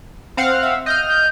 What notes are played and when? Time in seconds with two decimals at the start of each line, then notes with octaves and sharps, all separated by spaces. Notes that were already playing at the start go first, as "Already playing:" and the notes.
0.37 C4 F5 F#5
0.62 E5
0.86 D#5 F6 G6
1.08 G6